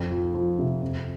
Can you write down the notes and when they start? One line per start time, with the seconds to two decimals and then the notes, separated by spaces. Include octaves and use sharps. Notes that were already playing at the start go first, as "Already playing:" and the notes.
Already playing: F2
0.12 F3
0.35 F3
0.59 C3
0.82 F2